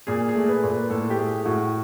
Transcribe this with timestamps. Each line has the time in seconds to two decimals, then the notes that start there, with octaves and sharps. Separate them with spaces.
0.07 A#2 G#4
0.29 G#4
0.35 A3
0.49 B4
0.63 A#2
0.69 B4
0.90 A2 A4
1.10 G4
1.18 A3 G#4
1.45 A2 F#4